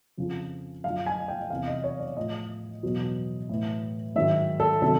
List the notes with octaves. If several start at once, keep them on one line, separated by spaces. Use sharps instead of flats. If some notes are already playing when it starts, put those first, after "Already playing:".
F2 C#3 F3
F#2 D3 F3 F5
G#5
G5
E2 C3 E3 F5
D#5
C#5
D5
A2 F3 D#5
E2 B2 F#3
A2 E3
G#2 D#3 F#3 E5
A4
C3 D#3 F#3 A4